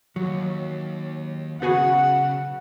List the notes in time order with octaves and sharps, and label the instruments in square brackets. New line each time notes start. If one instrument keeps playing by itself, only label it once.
[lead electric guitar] D#2 [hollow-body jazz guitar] F#3
[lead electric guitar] C#3 [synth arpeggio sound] B3 F#4 G#4 [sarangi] F#5